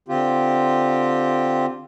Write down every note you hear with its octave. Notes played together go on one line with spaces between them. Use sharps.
D3 C4 F4 G4